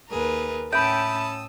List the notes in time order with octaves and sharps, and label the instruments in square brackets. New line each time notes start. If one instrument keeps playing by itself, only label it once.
[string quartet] D#2 G#4 [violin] A#4 B4
[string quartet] A2 D#6 E6 [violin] C#4 A5 [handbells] E5 B5 [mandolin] G5